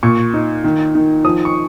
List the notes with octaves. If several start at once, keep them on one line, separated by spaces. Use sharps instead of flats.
A#2 C#6
D#4
D#3
D#3
F3 D#6
C#6